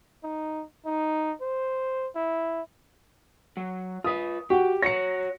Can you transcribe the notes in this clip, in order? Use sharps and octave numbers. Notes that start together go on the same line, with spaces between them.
D#4
D#4
C5
E4
F#3
F4 B4 D#6
F#4 G4 F#5
F#4 C#5 A#6 C#7